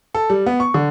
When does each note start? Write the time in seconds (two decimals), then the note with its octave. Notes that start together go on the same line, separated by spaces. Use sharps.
0.15 A4
0.30 G3
0.46 B3
0.60 C#6
0.74 D3